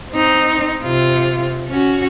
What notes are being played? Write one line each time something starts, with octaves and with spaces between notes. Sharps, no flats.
C4 D#4
C3 F4
C#4 F#4